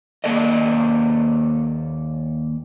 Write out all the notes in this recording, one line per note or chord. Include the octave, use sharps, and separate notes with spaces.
D#2 A#3 A4 D5 D#5